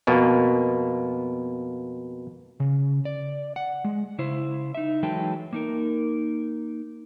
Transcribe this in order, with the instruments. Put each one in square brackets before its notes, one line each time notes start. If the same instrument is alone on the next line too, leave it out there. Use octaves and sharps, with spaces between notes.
[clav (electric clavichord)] F2 B2 A#3
[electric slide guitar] C#3
D5
F#5
G#3
C#3 E4 C5
D#4 E5
E3 F#3 G#3 A4 B4 G5
A#3 D#4 A#4